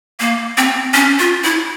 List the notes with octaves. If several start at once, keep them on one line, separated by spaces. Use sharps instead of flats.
A#3
C4
C#4
F4
E4